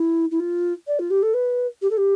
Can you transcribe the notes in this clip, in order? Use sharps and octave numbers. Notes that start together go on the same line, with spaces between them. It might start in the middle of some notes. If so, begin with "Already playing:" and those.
Already playing: E4
E4
F4
D5
F4
G4
A4
B4
G4
A4
G4